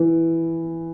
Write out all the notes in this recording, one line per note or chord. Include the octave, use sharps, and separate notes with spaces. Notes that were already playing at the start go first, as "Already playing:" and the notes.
Already playing: E3